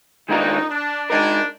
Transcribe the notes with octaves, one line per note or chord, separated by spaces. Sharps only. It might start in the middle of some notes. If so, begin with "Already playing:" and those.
D#3 G#3 D4 D#4 F4 A#4
D4
G#3 D4 D#4 A#4